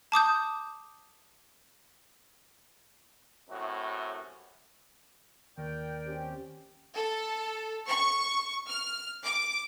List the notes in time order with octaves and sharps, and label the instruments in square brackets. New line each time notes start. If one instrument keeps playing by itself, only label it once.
[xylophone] A5 D6 D#6 G6
[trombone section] F#2 A2 C3 F#4
[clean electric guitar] D#2 [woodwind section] A#4 D5 G5
[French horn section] C4 C#4 G4
[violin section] A4
C#6
F6
D6